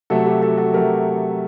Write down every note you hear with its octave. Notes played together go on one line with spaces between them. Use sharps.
C3 F#3 A3 F#4 A4
G4
F#4 A4
F#4 A4
C3 F#3 A3 G4 A#4